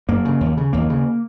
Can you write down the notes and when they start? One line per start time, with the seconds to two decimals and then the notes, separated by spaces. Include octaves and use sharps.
0.08 F#2 A#3
0.25 C#3
0.41 D#2
0.57 C#3
0.73 D#2 A#3
0.90 C#3